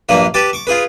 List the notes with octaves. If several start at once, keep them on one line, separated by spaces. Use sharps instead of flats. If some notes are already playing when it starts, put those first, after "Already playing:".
A#1 G2 A#3 B4
G4 B4 A5 D6
C#6 D6
F4 G#4 B4